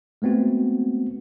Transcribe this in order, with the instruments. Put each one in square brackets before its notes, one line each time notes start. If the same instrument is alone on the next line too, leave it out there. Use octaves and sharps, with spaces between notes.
[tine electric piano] G#3 A3 B3 C4 F#4